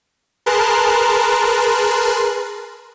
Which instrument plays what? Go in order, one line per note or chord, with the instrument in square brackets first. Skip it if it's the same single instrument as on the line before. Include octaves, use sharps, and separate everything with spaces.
[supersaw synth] G#4 A#4 B4 A5 C6 F#6